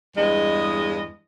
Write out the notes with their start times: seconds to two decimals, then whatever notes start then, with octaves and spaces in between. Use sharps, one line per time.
0.16 E2 G2 G#3 D#5